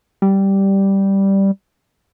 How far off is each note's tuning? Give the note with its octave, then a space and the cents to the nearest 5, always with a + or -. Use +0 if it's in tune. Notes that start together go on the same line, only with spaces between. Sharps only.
G3 -5